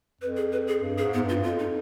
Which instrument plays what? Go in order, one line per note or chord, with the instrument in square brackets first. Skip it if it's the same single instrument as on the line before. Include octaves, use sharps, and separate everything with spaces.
[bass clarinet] F2 [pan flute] B4
[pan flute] G#4
B4
G#4
[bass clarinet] G2
[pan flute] G#4
[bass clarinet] G#2
[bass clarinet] G#2 [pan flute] B3
[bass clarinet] G2
[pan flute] F4
[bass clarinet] F2 [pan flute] F4
[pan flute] D#4